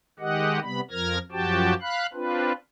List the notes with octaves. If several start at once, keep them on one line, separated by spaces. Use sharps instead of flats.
D#3 G#3 G4 D#5 F#5
C3 G3 B3 B5
F2 F3 A#4 F6 G#6 A#6
F#2 F3 F#4 G4 G5 A5
F5 B5 F#6
C4 D4 F4 B4